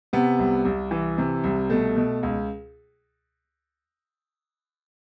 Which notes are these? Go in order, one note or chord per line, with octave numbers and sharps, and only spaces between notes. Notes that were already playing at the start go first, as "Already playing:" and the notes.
C3 B3
C2
C2
E3
C3
C2
B2 A3
B2
C#2